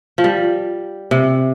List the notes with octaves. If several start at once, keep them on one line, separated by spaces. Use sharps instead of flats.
F3
G3
C3